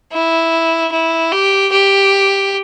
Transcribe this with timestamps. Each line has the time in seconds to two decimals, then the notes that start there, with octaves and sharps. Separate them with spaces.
0.13 E4
0.92 E4
1.32 G4
1.72 G4